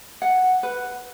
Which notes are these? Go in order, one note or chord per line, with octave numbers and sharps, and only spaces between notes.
F#5
B4